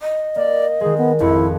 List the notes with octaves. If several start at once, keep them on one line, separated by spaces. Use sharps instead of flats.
D#5
A#3 D5
D#3 G#3 G#4
B3
G#1 F2 E4 C#7